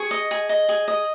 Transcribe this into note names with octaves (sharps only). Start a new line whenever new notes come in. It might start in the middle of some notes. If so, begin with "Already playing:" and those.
Already playing: G#4 C#6
D#5
G#4
D#5
G#4
D#5